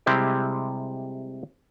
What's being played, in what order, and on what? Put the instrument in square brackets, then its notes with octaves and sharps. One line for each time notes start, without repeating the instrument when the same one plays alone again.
[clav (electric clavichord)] C3 G3 G#3 C4 E4 G4